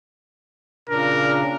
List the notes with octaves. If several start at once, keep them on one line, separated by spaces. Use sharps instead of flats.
A#2 C#3 D4 A#4